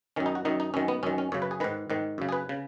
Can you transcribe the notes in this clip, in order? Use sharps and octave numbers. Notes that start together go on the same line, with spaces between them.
F#2 D#3 C#4
D#4
F#4
F#2 D#3 D#4
D#4
F#2 D#3 C#4
B3
F#2 D#3 C#4
C#4
F#2 C#3 C#5
B4
G#4
G#2 D#3 B4
G#2 D#3
F#2 C#3
G#4
B4
C#3